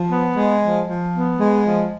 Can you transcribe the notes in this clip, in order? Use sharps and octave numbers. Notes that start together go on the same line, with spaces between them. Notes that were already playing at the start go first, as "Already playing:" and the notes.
Already playing: F3
B3
G#3
F3
F3
B3
G#3
F3